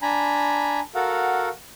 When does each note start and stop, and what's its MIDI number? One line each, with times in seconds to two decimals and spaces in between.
0.02 0.80 62
0.02 0.80 80
0.02 0.80 82
0.02 0.80 83
0.95 1.49 66
0.95 1.49 69
0.95 1.49 70
0.95 1.49 77
0.95 1.49 78